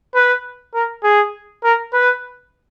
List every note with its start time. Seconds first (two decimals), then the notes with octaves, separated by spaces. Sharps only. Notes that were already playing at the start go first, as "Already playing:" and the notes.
0.15 B4
0.74 A#4
1.03 G#4
1.64 A#4
1.93 B4